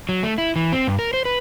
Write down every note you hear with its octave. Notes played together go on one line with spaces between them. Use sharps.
F#3
A3
E4
E3
C4
G2
A#4
C5
B4